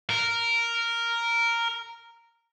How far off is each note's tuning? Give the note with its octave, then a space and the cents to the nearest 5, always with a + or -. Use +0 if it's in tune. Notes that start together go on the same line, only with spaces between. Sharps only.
A#4 -5